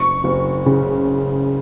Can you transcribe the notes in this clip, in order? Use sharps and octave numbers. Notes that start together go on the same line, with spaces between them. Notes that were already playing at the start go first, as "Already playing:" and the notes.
Already playing: F#1 C#6
F#1
C#3